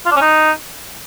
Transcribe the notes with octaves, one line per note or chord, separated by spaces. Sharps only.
F4
D4
C#4
D#4